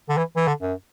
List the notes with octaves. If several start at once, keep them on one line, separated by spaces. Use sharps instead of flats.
D3
E3
E3
D3
F#2